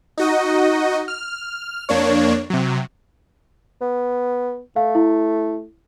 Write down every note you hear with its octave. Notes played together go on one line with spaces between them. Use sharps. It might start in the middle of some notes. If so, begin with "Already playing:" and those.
D#4 F#4 D#5
F6
F2 A#3 D4 C#5
C3 F#3
B3
A3 F5
E4